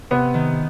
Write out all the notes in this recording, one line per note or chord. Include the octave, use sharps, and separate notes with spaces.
C3 B3
D#3